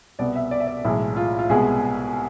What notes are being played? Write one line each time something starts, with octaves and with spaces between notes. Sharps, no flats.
C2 B2 B3 D5
E5
D5
E5
D5
B1 A2 E3 G#3 E4
F4
F4
C2 B2 G#3 B3 G#4